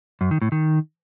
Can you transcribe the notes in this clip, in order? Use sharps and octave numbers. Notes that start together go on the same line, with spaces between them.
F#2
D#3
A2
D#3